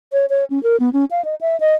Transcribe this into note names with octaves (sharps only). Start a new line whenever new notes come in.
C#5
C#5
C#4
A#4
B3
C#4
F5
D#5
E5
D#5